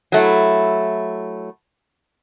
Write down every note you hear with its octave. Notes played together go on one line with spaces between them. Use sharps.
F#3 A3 E4